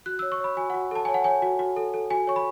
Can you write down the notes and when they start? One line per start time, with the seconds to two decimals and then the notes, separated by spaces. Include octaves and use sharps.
0.06 F#4 F#6
0.19 C#5 E6
0.32 C#6
0.40 C#5 B5
0.57 F#4 G#5
0.70 F#4 F#5
0.91 A4 A5
1.05 C#5 G#5
1.14 F#5
1.24 C#5 G#5
1.42 F#4
1.59 F#4
1.77 A4
1.94 A4
2.10 F#4 G#5
2.27 C#5 C#6
2.36 B5